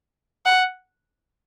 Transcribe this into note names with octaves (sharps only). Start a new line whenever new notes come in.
F#5